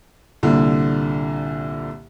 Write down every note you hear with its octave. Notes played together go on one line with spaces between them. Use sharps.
C2 A#2 D3